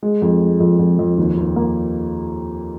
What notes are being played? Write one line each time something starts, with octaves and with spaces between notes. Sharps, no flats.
G#3
F2
G#3
F2
F2
F2
D#2
D#2
A#3